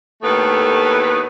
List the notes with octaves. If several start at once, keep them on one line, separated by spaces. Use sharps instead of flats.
D#2 A2 A3 B3 B4